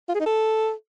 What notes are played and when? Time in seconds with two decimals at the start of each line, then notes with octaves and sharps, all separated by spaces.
0.09 F4
0.15 G#4
0.20 D#4
0.26 A4